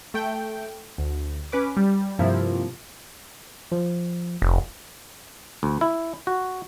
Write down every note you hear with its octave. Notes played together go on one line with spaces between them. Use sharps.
A3 G5
D2
C#4 B4 D6
G3
G2 C3 F3 A#3 E4
F3
F1
D2
E4
F#4